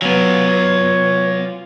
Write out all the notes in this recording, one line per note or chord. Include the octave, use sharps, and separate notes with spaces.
F#3 B3 F4 C#5 G#5